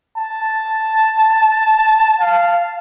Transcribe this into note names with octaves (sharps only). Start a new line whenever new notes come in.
A5
F5